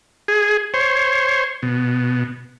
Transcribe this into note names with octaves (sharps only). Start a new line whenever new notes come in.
G#4
C5 C#5
B2